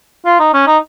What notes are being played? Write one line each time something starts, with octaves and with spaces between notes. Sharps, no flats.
F4
D#4
C#4
D#4